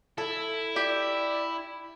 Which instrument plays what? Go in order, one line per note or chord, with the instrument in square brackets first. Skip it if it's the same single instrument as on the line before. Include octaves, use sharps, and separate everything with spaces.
[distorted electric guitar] E4 [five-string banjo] A4
[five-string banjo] G4 [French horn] D5